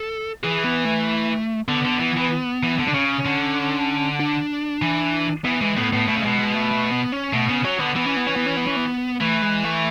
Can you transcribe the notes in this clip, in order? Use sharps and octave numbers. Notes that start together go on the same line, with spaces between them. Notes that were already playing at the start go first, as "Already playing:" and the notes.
Already playing: A4
E3 G#4
B3
A3
D3 B3
D3
E3
E3
E3
D3
D4
C#3 C#4
D3
D4
E3
E3 B3
E3 G#3
A2 B3
A2 B3
B2 A3
C#3
B2 G#3
G#3
A3
A3
B3
C#4
B2 A3
C#3 B3
F#3 C#4
D3 B3
E3 B3
C#4
B3
C#4
B3
C#4
B3
C#4
B3
E3 A3
G#3
A3